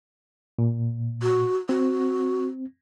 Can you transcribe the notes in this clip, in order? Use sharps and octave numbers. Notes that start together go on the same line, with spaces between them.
A#2
F#4
C4 F#4